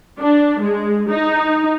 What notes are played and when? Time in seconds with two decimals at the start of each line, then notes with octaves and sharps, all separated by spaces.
0.21 D4
0.62 G#3
1.10 D#4